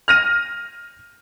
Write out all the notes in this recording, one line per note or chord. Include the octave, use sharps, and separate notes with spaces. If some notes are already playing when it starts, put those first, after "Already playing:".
F6 A#6 D#7